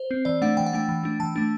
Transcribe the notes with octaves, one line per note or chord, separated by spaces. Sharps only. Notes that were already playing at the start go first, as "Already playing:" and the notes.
Already playing: C5
C4
E3 D5
A3 D4 F#5
E3 G5
F#5
A3 D4 G5
E3
A3 D4
E3 A5
A3 D4